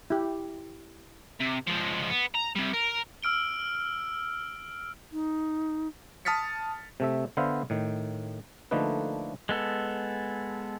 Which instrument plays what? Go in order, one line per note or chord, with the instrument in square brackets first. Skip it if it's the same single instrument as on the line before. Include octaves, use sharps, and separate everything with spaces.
[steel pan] E4 G4
[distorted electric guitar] C3
F3 G#3
B3
A#5
C3 G3
A#4
[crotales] E6 F6 D7 G7
[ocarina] D#4
[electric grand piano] A5 D#6 F6 A6 B6 C#7
[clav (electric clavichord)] C3 A3 E5
D3 B3 C5 E5 F5
A2 D#3
D3 F3 A3 A#3 D#4 B4
[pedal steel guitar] G#3 B3 A4